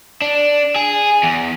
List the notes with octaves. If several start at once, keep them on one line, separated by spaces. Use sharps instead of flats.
D4
G#4
E2